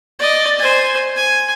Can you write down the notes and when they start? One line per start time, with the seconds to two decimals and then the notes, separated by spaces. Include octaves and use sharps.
0.19 D5 D#5
0.59 C5 G#5
1.16 G#5